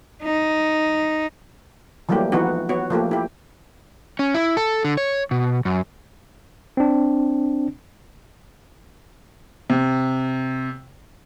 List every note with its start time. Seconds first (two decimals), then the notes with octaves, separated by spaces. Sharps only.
0.22 D#4
2.09 E3 F#3 G3 A3 A#3 G4
2.32 E3 F3 B3 D#4 E4 F#4
2.69 B3 F#4 C#5
2.90 F3 A3 A#3 G4
3.11 E4 G4
4.19 C#4
4.34 E4
4.57 A4
4.84 D3
4.97 C#5
5.31 B2
5.65 F#2
6.77 C4 D4
9.70 C3